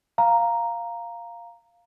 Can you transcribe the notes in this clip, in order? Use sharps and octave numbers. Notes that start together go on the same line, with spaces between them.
F5 A#5